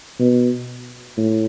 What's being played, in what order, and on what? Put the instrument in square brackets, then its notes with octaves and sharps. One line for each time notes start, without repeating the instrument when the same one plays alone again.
[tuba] B2
A2